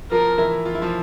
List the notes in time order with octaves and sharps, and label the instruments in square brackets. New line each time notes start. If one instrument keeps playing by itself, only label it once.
[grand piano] F3 F4 [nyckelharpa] A#4
[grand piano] E3 E4
F4
E4
F3 F4